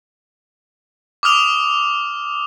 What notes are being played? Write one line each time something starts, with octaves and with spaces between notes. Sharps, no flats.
D6 D#6 F6 F7